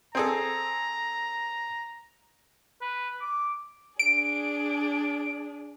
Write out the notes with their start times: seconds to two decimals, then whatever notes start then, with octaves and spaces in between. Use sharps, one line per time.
0.15 C4 G#4 A4 A#5
2.81 B4
3.21 D6
3.99 D4 G#4 D7